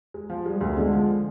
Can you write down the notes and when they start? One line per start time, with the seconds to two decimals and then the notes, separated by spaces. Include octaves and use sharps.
0.14 G#3
0.30 F3
0.46 G3 G#3
0.61 D2
0.76 D3 G#3
0.93 F3